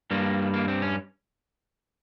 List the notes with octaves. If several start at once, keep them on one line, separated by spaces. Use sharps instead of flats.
G2 G3 A#3
A#3
C4
C#4